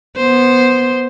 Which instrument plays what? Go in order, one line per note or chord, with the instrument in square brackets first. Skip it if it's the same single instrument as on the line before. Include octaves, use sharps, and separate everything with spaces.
[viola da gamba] B3 C5